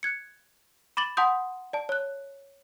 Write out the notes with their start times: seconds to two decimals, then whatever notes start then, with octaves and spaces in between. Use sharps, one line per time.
0.03 F#6 G#6 C#7
0.97 B5 D6 A6 F#7
1.17 F#5 A5 C6 D#6 G6
1.73 D5 A5
1.89 C#5 F#6